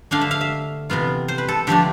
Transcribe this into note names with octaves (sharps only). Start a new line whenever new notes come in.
D3 A3 D4 F5
E5
F5
E5
C3 E3 B3 F4
C5
B4
A4
D3 F3 A3 D4 G4